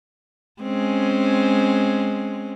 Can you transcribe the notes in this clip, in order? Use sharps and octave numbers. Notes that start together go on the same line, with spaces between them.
G#3 C4 C#4